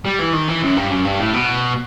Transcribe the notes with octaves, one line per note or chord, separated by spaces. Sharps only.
G3
E3
D#3
E3
F#2
G2
F#2
G2
A2
B2